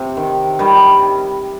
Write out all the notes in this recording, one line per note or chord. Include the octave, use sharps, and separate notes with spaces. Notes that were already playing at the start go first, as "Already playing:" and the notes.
Already playing: C3
D#3
D#3 G3